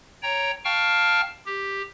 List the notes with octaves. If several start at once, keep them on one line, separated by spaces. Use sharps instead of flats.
C#5 G5 A#5
F5 G5 A5 C#6 F6
G4